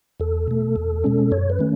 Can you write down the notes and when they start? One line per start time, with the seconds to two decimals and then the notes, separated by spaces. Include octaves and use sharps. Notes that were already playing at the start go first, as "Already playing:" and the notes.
0.20 E2 A4
0.48 B2 A3
0.76 E2
1.04 B2 G#3 C#4
1.31 F#2 C#5
1.50 B4
1.59 D#3 A3 C#4